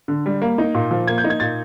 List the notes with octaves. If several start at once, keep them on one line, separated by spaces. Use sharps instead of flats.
D3
G3
A#3
D#4
A#2
F3
A#3 G#6
G6
D#4
G#6
A#2 A6